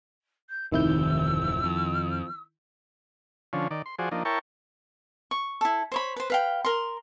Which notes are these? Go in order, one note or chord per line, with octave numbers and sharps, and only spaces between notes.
G6
D1 F2 C3 D#3 E4 E6 G6
F2
D3 F3 C#4
D#3 D5
C6
F3 F#4 G#4 C5 D5
F3 A#3 D4 D#4
E4 A#4 C#5 G5 A5 C#6
C#6
E4 A4
C5 C#5 B5
B4 C5
B4 F5 G5
A#4 C6